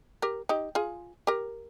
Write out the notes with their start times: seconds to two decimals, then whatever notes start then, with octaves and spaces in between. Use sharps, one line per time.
0.22 G4 A#4
0.49 D#4 G4
0.75 F4 G#4
1.27 G4 A#4